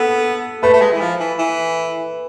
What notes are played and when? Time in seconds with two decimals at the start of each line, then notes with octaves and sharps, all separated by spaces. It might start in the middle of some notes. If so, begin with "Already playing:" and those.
Already playing: B3 A4
0.63 A3 B4
0.73 A3
0.81 G#3
0.92 E3
1.01 F3
1.20 E3
1.39 E3